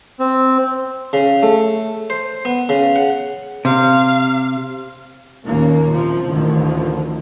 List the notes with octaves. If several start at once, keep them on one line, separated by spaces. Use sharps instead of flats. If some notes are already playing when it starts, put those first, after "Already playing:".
C4
C#3
A3
C5
B3
C#3
F#5
C3 F5
D#2 A#2 A#3 C#4
C3 F3
A1 D2 D3 D#3 F3